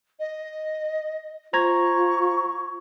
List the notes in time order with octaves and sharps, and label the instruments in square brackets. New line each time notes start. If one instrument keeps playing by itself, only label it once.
[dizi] D#5
[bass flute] F4 [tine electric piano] C5 A#5 G#6 [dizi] C#6